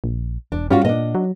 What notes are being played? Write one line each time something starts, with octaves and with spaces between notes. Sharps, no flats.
A#1
E1 D4
G3 C#4 F4 F#4
A#2 D4 D#5
F#3